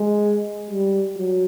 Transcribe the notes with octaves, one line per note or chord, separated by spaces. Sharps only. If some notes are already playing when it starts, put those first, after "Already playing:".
Already playing: G#3
G3
F#3